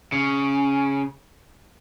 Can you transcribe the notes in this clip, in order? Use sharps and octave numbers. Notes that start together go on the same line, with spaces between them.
C#3